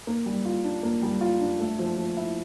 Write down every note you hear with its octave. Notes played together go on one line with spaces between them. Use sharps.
A#3
G3
F4
D4
A#3
G3
F4
D4
A3
F3
F3
E4